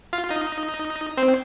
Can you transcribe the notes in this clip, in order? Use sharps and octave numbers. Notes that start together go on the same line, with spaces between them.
F4 F5
D#4 D#5
C4 C5